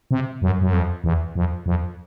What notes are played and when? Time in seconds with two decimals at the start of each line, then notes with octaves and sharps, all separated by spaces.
0.11 C3
0.42 F#2
0.61 F#2
0.73 F2
1.04 E2
1.35 F2
1.66 F2